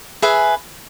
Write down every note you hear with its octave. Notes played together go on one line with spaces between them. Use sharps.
G#4 B4 E5 G#5